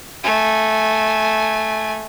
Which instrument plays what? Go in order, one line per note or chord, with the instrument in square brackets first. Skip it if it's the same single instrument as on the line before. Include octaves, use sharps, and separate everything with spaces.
[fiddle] A3 G#5